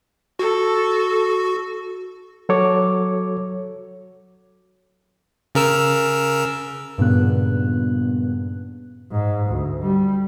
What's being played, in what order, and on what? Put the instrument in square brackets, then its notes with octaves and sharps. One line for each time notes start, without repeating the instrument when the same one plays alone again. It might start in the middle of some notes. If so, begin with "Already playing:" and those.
[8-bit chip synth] F#4 [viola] A4
[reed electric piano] F#3 F#4 A4 C#5 D6
[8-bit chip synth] C#3 A#4 E6
[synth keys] G2 A#2 C#3 B3 F#6
[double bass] G#2
D2
G3